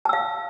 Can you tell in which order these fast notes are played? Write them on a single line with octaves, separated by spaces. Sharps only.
A5 E6 F5